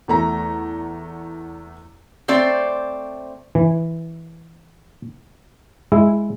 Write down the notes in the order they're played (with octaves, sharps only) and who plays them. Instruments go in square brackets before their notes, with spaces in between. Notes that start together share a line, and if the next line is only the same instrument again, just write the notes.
[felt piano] E2 A3 A#5
[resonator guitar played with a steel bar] A3 C4 C5 D5
[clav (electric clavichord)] E3
G#3 E4